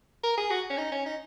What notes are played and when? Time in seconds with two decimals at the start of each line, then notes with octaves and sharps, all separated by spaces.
0.24 A#4
0.37 G#4
0.50 F#4
0.70 C#4
0.78 D#4
0.92 C#4
1.06 D#4